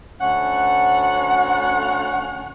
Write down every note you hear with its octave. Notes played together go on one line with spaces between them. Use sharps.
D2 C#4 F#5